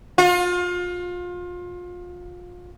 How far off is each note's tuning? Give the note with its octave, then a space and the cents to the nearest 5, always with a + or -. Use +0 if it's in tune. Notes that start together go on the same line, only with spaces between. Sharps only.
F4 +30